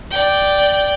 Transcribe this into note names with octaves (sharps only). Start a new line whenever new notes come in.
D5 G5